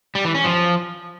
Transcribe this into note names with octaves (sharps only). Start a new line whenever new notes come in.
G3
E3
C#4
F3